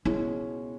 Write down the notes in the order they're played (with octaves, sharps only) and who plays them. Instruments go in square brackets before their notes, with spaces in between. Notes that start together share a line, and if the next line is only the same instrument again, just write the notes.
[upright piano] C#2 B2 G#3 C#4 [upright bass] E4